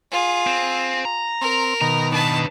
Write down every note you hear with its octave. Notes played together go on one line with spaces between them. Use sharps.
F4 G#4
C4
A#5
C4 A#4
B2 D#3 A#5
D4 B4 A5